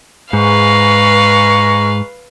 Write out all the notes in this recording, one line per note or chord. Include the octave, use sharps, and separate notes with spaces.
G#2 G#3 B4 F5 A#5 C#6